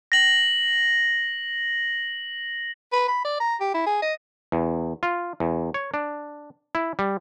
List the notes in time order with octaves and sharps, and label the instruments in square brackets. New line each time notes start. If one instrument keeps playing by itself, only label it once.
[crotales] A#6 F#7
[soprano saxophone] B4
B5
D5
A#5
G4
E4
G#4
D#5
[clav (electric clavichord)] E2
F4
E2
C#5
D4
E4
G3